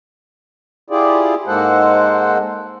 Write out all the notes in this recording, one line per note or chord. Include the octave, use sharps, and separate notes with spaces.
E4 F4 G4 G#4 D5
G#2 G#3 A#3 A4 C5 F#5